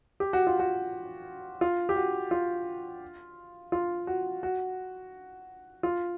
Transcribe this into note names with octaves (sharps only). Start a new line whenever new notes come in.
G4
F#4
F4
F#4
F4
G4
F#4
F4
F4
F#4
F#4
F4